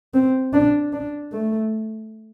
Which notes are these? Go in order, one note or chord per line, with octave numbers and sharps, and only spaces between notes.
C4
D4
D4
A3